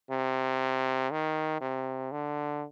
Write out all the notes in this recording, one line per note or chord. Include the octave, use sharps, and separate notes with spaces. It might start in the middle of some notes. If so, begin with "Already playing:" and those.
C3
D#3
C3
D3